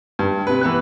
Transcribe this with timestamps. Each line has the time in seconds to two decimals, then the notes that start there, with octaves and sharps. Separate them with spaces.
0.19 G2
0.47 C3 B4
0.61 E3 B3 B4 F#6